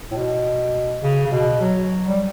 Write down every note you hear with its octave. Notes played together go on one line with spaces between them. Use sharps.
A2
B2
C#3
C#3
B2
F#3
G3